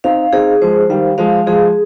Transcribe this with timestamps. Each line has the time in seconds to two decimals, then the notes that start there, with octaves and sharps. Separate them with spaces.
0.04 C4 D#4 F5
0.33 C4 D#4 G#4
0.61 F3 G#3 C5
0.89 D#3 G3 F5
1.18 F3 G#3 F5
1.46 F3 G#3 G#4